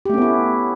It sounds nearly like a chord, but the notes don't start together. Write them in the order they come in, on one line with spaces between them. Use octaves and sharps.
G4 A3 C#4 B3 E4